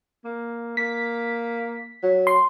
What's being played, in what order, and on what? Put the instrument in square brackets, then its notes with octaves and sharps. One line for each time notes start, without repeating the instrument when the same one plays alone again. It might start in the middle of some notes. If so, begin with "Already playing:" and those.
[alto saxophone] A#3
[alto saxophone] A#3 [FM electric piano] B6
[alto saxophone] F#3
[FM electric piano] C6